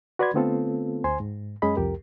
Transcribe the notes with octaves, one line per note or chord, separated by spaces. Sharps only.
F#4 B4 D5 B5 C6 G#6
D3 A3 B3 C4 F4 A4
D2 C5 G#5 C6
G#2
F#2 G#3 C#4 G#4 D#5 B5
C2 F2 G4 A#4